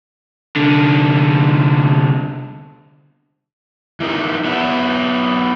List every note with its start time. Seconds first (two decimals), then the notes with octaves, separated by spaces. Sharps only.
0.56 C2 D3
4.00 E3 A#3 D#4
4.45 F#3 B3 E5 F#5